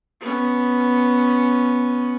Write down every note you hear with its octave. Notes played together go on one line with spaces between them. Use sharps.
B3 C#4